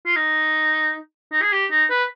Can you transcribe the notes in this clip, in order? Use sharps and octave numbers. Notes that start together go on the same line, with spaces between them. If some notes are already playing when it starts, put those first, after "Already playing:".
F4
D#4
D#4
G#4
G4
D#4
B4